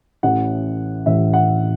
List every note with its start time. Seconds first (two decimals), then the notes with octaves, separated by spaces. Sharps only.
0.23 A1 A2 E3 F#5
1.06 A1 A2 E3 E5
1.34 F#5